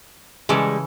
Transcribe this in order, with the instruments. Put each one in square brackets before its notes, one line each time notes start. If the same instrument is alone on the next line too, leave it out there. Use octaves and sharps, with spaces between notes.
[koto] C#3 E3 A4 [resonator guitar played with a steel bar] G3 G#3